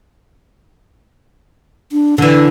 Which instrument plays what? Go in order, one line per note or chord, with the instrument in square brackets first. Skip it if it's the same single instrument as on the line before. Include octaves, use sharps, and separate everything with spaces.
[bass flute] D4
[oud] D3 E3 [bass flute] D4